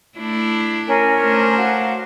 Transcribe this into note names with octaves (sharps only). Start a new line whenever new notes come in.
A3 D4 E4
C#4 A#4 G#5
A3 D4 C5
F#4 F5